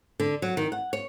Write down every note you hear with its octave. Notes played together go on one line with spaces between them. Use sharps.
D3
F#3
D#3
F#5
C#5